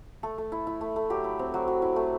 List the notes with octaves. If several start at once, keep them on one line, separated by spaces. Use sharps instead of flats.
A3 A4
A3
E4
E4
A3
A3
F#3 G4
E4
C4
F#3
F#3
E4
A3